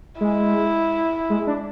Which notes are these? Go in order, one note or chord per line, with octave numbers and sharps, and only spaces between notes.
G#3 E4
G#3
D4